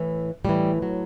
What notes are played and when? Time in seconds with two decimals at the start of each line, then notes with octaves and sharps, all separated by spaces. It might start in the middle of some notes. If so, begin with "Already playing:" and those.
Already playing: A2 E3
0.44 A2 E3 G3
0.82 F#3